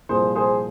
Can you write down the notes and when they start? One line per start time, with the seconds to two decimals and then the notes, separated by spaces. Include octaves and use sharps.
0.09 C2 A#2 F3 G#4 C5
0.35 G#4 C5